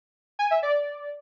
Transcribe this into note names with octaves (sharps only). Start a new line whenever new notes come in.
G#5
E5
D5